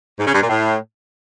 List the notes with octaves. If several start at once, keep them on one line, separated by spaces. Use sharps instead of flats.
G#2
C#3
G2
A#2
A2